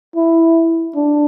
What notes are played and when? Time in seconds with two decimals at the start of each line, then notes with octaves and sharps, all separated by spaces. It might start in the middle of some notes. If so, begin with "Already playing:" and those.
0.16 E4
0.96 D4